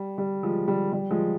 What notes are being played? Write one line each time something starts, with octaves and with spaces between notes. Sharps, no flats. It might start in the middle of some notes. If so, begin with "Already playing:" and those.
Already playing: G3
G3
F3 G#3
G3
G3
F3 G#3